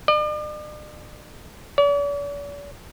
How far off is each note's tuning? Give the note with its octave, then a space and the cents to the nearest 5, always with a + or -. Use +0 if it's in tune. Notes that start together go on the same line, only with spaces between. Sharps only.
D5 +45
D5 -45